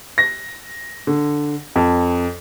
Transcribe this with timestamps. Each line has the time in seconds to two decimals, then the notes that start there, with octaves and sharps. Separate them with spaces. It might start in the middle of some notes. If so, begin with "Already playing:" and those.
0.18 A#6
1.07 D3
1.76 F2